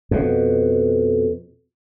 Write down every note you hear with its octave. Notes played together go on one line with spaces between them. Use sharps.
F2 B2